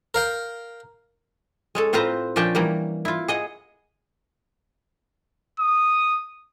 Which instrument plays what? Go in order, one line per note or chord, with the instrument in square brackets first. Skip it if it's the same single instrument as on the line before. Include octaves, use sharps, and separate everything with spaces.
[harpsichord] A#4 F5 G5
[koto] G#3 C#4 A4
A2 C4 F4 B4 C5 A#5
A#2 F3 C#4 D4 G5 A5
E3 G3 A#3
E4 F4
G#4 D#5 F#5
[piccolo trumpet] D#6